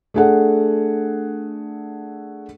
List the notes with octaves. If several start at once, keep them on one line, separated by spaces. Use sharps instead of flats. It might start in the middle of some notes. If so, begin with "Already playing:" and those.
A3 D4 G#4 A4 F#5